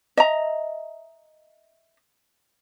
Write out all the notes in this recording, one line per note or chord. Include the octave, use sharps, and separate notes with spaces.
D#5 E5 A#5